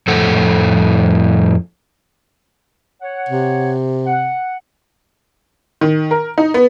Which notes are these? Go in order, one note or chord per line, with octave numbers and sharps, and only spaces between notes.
F2 A2 A4 F#5
C#5 F#5
C3
F#5
D#3
A#4
D#4
B3